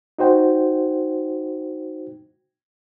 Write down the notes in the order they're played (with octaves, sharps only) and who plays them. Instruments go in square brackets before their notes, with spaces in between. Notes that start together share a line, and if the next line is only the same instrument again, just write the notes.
[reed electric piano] D#4 F#4 C5 G5